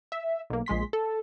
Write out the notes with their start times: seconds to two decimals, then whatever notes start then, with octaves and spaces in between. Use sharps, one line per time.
0.12 E5
0.50 B1 A#3
0.66 A#1 G#3 C6 B6
0.93 A4